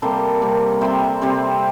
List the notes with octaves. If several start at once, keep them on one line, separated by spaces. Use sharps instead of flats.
C3 G3 A#3 A4 C5
C3 G3 A#3
C3 G3 C4 C5 E5
C3 G3 C4